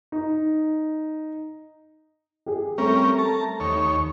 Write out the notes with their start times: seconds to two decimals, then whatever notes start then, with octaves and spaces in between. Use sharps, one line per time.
0.12 D#4
2.46 G4 G#4
2.78 G3 A3 C4 C#4 A#4
3.19 A5 A#5
3.60 D#2 C#5